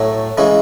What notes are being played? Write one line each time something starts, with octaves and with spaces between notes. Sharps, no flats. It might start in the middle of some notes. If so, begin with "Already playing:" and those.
Already playing: A2 F#3 A3
C#3 E3 G#3